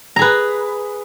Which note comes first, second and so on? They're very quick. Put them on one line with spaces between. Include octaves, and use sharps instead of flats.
A#5 G#4 B4